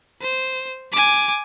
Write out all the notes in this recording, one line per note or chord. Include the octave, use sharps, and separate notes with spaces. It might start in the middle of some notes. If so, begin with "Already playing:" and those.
C5
G#5 D6